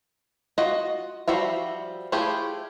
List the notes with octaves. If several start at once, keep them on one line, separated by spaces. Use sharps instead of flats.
F4 F#4 D#5
F3 G3 F#4 E5 F5
A3 E4 F4 G4 G#4